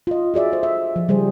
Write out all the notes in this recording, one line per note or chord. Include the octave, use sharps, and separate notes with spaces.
F4 D#5
F#4 G#4 D5 E5
A4 C5
E5
F3
C#3 G3 G#4 C5